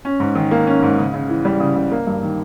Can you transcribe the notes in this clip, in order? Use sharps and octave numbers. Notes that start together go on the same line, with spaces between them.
C#4
G#2
D#3
A#3
C#4
G#2
C#3
C#3
E3
G3
C#3
C#3
A#3
G2
D#3